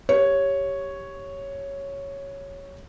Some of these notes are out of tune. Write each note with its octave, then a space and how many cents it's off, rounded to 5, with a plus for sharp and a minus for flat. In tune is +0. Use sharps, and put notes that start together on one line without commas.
G4 +0 C#5 +0